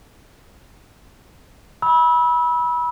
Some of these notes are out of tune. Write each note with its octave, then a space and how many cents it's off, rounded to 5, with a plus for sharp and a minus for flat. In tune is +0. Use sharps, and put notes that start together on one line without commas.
B5 -25 E6 -25